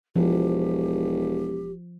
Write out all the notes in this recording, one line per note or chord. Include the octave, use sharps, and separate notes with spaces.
E1 F3 G4